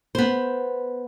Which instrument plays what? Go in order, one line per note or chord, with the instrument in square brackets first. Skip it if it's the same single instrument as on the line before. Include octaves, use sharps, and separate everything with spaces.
[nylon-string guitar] B3 C5